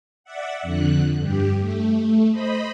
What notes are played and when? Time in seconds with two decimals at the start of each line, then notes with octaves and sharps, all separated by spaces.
0.24 D5 E5 F#5
0.62 F2 D3 F#6
1.18 G2 G4
1.60 A3
2.30 C5 D#5 B5